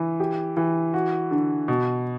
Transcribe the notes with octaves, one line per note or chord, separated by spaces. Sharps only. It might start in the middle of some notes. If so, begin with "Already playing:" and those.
Already playing: E3
G4
E3
F#4
D3
B2